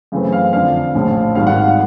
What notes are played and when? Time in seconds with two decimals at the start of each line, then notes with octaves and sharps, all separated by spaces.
0.12 F#2 C#3 E3 A3 C4
0.33 F5
0.53 F2 D3 F3 F5
0.95 A#1 A2 F3
1.35 G#1 G#2 D#3 G3 F5
1.47 F#5
1.57 F5
1.68 F#5